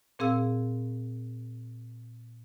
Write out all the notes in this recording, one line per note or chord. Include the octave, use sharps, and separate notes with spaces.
A#2 C4 G#4 F5 E6